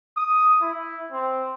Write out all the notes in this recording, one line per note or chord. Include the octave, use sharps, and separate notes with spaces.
D#6
E4
C4